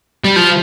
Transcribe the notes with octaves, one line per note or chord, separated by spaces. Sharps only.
G3
F3